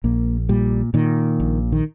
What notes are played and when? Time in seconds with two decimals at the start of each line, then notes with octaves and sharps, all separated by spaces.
0.04 A#1 A#3
0.49 A#2 G3
0.94 A#2 D#3
1.40 A#1
1.72 D#3